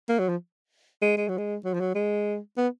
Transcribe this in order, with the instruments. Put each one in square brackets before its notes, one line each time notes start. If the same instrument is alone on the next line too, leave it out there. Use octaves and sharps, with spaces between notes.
[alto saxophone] A#3
F#3
F3
G#3
G#3
F#3
G#3
F#3
F3
F#3
G#3
B3